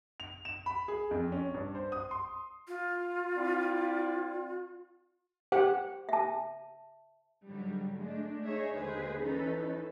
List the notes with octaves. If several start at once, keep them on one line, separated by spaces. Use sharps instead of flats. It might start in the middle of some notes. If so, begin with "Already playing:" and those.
F7
E7
B5
G#4
F2
C#4
G2
C5
D#6
C6
F4
C4 E4 D5
G4 C5 F#5
E5 A5
G#2 D3 F#3 G3
G#3 A3 D4
D#4 G#4 C#5 E5
D#2 D3 G#3 G#4 B4 C5
E3 C#4 D#4 A4 B4